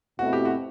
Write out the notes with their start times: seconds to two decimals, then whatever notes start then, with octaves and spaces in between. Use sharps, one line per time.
0.19 B2 A3 C4 E4 F#4
0.33 G4
0.45 F#4